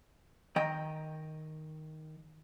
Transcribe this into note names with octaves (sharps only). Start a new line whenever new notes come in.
D#3 D#5 G5 A#5